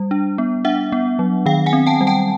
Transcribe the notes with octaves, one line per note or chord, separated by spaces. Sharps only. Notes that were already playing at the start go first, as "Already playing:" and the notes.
Already playing: G3
D4
B3
D4 E5 F#5
B3
F#3
D#3 F5 G5
F#5 G#5
C4
G5 A5
G3
G5 A5